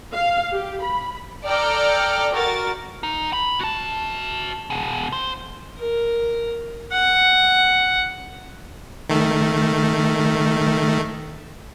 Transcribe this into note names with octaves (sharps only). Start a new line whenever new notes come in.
F5
G4
B5
A4 D5 G5 A#5 F6
F#4 A#4 A6
D#4
B5
F#4 A5
B2 G#4
C5
A#4
F#5
D#3 A3